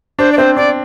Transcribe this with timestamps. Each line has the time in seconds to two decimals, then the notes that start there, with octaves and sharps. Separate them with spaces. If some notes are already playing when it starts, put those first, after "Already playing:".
0.19 D4 C5
0.32 D5
0.38 C4 C5
0.56 D4 D5